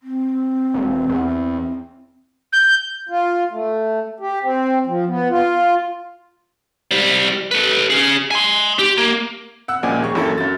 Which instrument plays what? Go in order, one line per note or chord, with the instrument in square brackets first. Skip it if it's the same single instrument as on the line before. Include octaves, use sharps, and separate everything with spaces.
[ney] C4
[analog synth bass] E1
E2
[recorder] G6
[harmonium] F4
A3
G4
C4
F3
B3
F4
[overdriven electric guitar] G3 C5
A4 B4
C#4 G#4
G#5 C6
G4
A#3
[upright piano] F#5 E6 F#6
C#2 A#2 F3 D5 G#5 G#6
D#2 G4 G#4 C#6
A1 F#2 A#3 E4 A4
F#2 A6